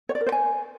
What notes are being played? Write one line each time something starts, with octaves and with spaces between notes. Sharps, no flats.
C#5
D5
A#4
C5
G#5